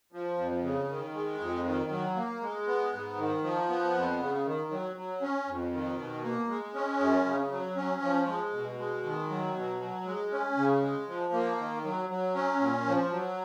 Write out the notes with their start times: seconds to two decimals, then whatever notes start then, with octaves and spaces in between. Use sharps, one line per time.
0.12 F3
0.38 F2
0.63 C#3
0.89 D#3
1.14 G#3
1.40 F2
1.65 D#3
1.90 F#3
2.16 A#3
2.41 G#3
2.67 B3
2.93 G#2
3.18 D#3
3.43 F3
3.69 B3
3.94 F2
4.20 C#3
4.45 D#3
4.71 F#3
4.96 F#3
5.22 C#4
5.47 F2
5.73 D#3
5.98 B2
6.23 A#3
6.49 G#3
6.74 C#4
7.00 F#2
7.26 C#3
7.51 F#3
7.76 C#4
8.02 F3
8.27 G#3
8.53 B2
8.78 G#3
9.04 D#3
9.29 F#3
9.55 B2
9.80 F#3
10.06 G#3
10.31 C#4
10.57 C#3
10.82 G#3
11.08 F3
11.33 A#3
11.58 D#3
11.84 F#3
12.10 F#3
12.35 C#4
12.60 A#2
12.86 F3
13.11 F#3